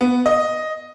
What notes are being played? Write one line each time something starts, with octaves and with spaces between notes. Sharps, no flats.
B3
D#5